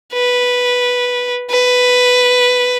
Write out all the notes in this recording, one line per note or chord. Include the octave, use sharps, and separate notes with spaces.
B4
B4